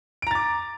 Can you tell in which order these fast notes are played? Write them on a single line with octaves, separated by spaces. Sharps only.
D7 A#5 A6 D6